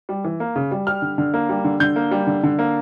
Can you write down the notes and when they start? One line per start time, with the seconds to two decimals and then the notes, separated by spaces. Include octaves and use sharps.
0.09 G3
0.25 E3
0.40 A#3
0.56 C#3
0.71 G3
0.87 G3 F6
1.02 D3
1.18 D3
1.34 A#3
1.49 G3
1.64 D3
1.80 D3 G6
1.96 A#3
2.11 G3
2.27 D3
2.43 D3
2.59 A#3